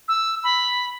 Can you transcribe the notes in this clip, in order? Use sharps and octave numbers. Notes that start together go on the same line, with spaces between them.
E6
B5